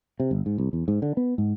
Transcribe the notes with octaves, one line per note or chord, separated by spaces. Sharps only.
C3
G1
G#2
C2
E2
G#2
D3
B3
G#2